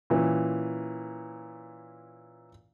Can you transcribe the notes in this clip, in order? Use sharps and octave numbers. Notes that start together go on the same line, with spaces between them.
A#2 E3 C#4